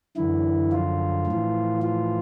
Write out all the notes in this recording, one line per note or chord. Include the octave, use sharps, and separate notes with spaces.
F#2 D3 E3 E4
F3 F4
A2 E3
F3 F4